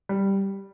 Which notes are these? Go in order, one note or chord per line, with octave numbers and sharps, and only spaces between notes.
G3